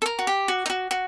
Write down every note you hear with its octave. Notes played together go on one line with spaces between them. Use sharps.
A4
A#4
F#4
G4
F#4
D#4
F#4
F#4